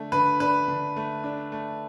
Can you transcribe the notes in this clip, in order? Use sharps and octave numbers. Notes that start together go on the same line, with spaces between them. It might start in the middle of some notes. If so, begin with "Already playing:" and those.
Already playing: D3 A3 D4
D3 B4
D4 B4
D3
A3
D4
A3